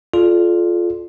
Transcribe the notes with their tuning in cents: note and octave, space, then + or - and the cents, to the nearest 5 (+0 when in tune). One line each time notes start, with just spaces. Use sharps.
F4 +0 A4 -35 D5 +10